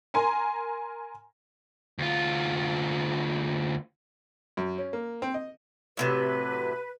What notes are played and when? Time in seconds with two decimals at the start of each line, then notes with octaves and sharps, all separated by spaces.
0.14 A#4 G#5 A#5 C6
1.98 D2 F4
4.57 F#2
4.78 C#4
4.93 A#3
5.22 C4
5.34 D#5
5.97 A2 C3 F#3 B4